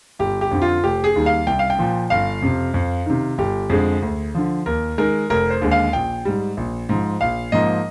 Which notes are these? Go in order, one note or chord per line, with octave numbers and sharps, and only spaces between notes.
G1 G4
G4
F2 D3
F4
F1 G4
G#4
D#2 D#3 G3
F5
C2 G5
F5
G5
A#2 F3
G1 F5
F2 C3
F2
C3 D#3
G1 G4
F2 D3 G#3 G#4
D2
D3 F3
D#2 A#4
D#3 G#3 A#4
F1 A#4
C5
D#2 D3 G#3
F5
A#1 G5
G#2 G3
A#1
G#2 F3
A#1 F5
G#2 F3 A#3 D#5